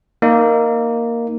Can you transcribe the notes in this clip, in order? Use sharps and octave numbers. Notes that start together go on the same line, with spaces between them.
A#3 D#4